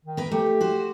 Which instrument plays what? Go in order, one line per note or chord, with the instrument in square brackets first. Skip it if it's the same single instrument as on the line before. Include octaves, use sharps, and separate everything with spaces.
[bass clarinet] D#3
[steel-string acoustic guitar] A#3 A#4 B4
[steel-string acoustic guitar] A3 [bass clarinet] G4
[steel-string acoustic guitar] F#4 C5